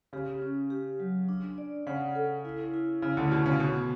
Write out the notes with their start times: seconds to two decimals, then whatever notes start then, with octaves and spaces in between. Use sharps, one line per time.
0.13 C#3 G4
0.42 C#4
0.70 G4
1.00 F#3
1.29 D4
1.58 D5
1.87 C#3 F#5
2.15 A4
2.45 E4
2.74 E4
3.02 C#3 E4
3.17 D2 D3
3.31 B2 E4
3.46 C#3
3.60 B2 B3